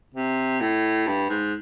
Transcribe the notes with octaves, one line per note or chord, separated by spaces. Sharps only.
C3
A2
G2
G#2